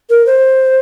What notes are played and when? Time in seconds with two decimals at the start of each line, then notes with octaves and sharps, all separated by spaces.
0.10 A#4
0.26 C5